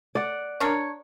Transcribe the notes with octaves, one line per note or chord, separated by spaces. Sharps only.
D5 F#5
D4 A#4 C#5